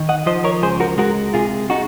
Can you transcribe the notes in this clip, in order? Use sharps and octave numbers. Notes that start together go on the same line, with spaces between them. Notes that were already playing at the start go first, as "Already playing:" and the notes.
Already playing: D#3
D#5 F#5
F3 C5 D#5
A#4 C#5
C#2 G#4 C5
F#4 A#4
G#3 F#4 A#4
C3 F4 G#4
G#3 D#4 F#4